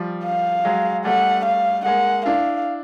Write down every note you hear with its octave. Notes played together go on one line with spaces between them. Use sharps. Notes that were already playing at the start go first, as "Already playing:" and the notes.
Already playing: F3 G3
F5
F#3 G#3
G3 A3 F#5
F5
G#3 A#3 F#5
D4 E4 F5